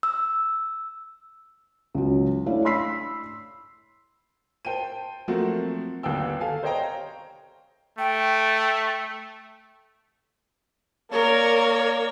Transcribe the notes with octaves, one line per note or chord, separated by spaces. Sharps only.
E6
C#2 F#3
A3 D4 E4 C#5 F5
B5 C6 E6 B6 C7
C5 G5 A5 D#7
F3 F#3 A3 A#3 C4 F#4
G1 D#2 B3 G5 E6
A4 F5 G#5 A5
C5 C#5 D#5 F5 G5 A#5
A3 G5
A#3 A#4 C#5 D5